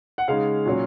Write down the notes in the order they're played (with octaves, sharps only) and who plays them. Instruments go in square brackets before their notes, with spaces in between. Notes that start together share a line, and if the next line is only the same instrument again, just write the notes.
[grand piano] F#5
C#3 G#3 D#4 F5
A#2 F#3 C#4